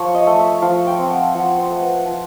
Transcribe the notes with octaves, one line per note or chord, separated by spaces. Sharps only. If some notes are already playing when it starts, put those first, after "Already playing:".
Already playing: F3 C#5
D#5
A3
E5
F3 F5
G5
C4
F#5
F3 F#5
C5
A3
B4
F3